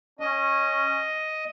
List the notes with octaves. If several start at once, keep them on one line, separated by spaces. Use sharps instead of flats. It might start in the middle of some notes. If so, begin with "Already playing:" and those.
C#4 D#5